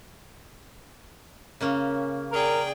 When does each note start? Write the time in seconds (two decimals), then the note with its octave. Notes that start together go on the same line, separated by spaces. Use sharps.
1.61 C#3 A#3 C#4
2.32 G#4 A#4 D5 G5